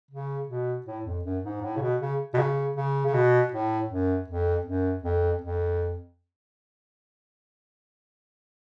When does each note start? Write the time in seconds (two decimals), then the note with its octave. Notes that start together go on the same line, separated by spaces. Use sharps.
0.11 C#3
0.49 B2
0.86 A2
1.06 F2
1.24 F#2
1.44 G#2
1.62 A2
1.77 C#3
1.81 B2
2.00 C#3
2.34 B2
2.38 C#3
2.76 C#3
3.06 C#3
3.14 B2
3.52 A2
3.90 F#2
4.28 F2
4.65 F#2
5.04 F2
5.42 F2